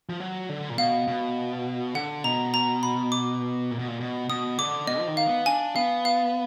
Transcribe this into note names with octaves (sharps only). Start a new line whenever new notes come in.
F3
F#3
D3
A#2
B2 F5
B2
D3 F#5
B2 A#5
A#5
B5
D6
A#2
B2
A#2
B2
B2 D#6
D3 D6
B2 D#5
F3
D#3
F5
B3
D4 G#5
B3 F5
F5